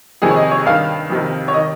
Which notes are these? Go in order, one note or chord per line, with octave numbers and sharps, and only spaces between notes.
F2 C3 D#3 G#4
C#5
D#5
C#5
G2 D#3 F5
F2 C3 D#3
C#5
D#3 D#5